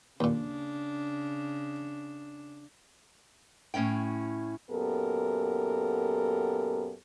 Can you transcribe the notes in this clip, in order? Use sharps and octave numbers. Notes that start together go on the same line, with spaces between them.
D#2 A#2 C#3 D4
A2 C#4 E4 G5
F#2 A#2 B3 G4 A4 A#4